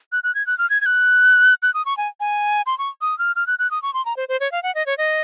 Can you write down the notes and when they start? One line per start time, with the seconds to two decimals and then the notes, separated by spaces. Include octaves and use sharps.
0.12 F#6
0.24 F#6
0.35 G#6
0.47 F#6
0.58 F6
0.70 G#6
0.81 G#6
0.86 F#6
1.63 F#6
1.74 D#6
1.86 C#6
1.97 G#5
2.20 G#5
2.66 C6
2.78 C#6
3.01 D#6
3.19 F6
3.36 F6
3.47 F#6
3.59 F#6
3.71 D#6
3.82 C#6
3.94 C6
4.05 A#5
4.17 C5
4.29 C5
4.40 C#5
4.52 F5
4.63 F#5
4.75 D#5
4.86 C#5
4.98 D#5